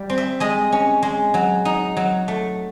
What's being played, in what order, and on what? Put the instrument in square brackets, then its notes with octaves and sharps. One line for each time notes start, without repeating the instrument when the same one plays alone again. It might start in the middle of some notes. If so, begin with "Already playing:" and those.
Already playing: [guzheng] G3 D5
C4
E5
G#3 D#5
C#4
G#3
F#3
D#4
F#3
A3